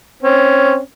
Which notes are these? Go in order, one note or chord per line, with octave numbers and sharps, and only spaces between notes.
C4 C#4